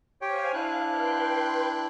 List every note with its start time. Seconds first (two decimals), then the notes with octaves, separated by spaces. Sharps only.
0.21 G4 C5 C#5 F5 G5 G#5
0.54 D4 E4 F5 F#6
0.91 B4 G5 C6